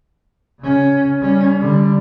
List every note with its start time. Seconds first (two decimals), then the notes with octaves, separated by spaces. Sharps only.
0.60 C#3 C#4
1.21 G3 C#4
1.60 D3 G3